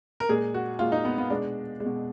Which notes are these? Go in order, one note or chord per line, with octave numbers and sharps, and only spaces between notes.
A#4
A#2 G#3 G#4
F#4
A#2 G#3 F4
D#4
B3
B3
B2 G#3 D4
G#3
B2